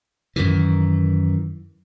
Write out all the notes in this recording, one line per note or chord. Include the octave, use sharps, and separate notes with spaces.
F#2 D#3 E3